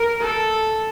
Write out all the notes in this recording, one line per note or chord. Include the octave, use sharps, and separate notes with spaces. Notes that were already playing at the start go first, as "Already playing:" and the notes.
Already playing: A#4
A4